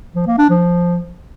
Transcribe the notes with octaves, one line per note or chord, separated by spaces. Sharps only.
F3
A#3
D4
F3